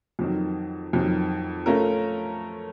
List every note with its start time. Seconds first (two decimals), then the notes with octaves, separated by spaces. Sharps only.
0.19 F2 D#3 F#3
0.93 F2 D#3 F#3
1.66 A3 C#4 F4 A#4